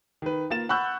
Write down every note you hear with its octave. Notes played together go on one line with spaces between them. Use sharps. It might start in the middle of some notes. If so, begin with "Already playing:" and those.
D#3 B4
A#3 F4 A6 E7
F#5 B5 C#6 E6 F#6 G6